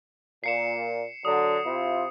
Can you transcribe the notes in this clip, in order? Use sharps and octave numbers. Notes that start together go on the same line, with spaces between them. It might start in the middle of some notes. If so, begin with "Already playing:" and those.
A#2 C7 C#7 E7
D3 F#3 D#6
C3 E4 F4